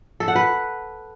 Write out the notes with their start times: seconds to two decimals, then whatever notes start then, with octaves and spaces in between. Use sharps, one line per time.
0.20 A4
0.28 F#5
0.36 B4